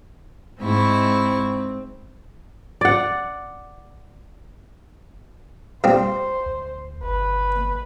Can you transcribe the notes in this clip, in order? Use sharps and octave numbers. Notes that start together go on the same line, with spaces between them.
G#2 C4 E4 C#6
D5 F#5
G2 C4 F4 C5
D2
G1 B4